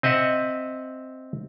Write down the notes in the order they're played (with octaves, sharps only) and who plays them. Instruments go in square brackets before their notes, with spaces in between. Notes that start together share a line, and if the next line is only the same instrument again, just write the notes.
[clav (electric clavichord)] C4 D#5 E5 F#5